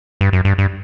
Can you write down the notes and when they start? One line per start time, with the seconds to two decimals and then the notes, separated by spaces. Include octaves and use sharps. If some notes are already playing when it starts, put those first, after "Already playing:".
0.21 G2
0.33 F#2
0.45 G2
0.58 G2